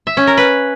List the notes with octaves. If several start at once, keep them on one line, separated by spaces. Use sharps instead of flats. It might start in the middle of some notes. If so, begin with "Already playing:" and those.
E5
C#4
A#4
B4